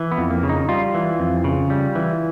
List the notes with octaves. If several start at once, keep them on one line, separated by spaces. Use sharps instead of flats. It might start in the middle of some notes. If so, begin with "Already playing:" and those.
Already playing: E3
B3
F2
A#3
C#3
D#4
G3 F4
E3
F2
C#3
G3
E3